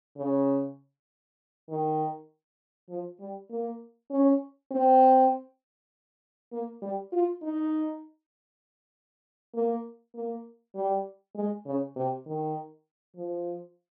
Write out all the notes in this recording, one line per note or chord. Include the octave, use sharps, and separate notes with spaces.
C#3
D#3
F3
G3
A#3
C#4
C4
A#3
G3
F4
D#4
A#3
A#3
G3
G#3
C#3
C3
D#3
F3